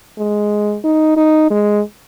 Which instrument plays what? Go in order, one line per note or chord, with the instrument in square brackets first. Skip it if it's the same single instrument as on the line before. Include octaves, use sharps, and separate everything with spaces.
[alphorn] G#3
D#4
D#4
G#3